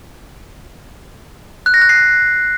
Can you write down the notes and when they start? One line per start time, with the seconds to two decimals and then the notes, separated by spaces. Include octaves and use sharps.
1.66 F#6
1.74 A#6
1.82 F#6
1.89 C7